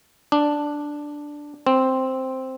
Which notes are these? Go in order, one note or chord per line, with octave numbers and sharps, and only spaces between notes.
D4
C4